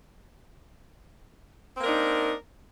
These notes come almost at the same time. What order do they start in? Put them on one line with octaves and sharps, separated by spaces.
C4 A#3 A#4 D4 D#4